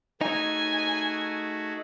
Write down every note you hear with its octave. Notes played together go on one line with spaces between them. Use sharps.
A3 D#4 F#4 G#4 G#5